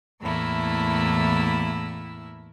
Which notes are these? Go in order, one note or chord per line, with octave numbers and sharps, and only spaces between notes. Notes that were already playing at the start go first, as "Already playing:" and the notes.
E2 A2 A3 A#3 E4 E6